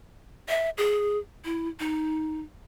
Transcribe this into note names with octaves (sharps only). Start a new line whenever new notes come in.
E5
G#4
E4
D#4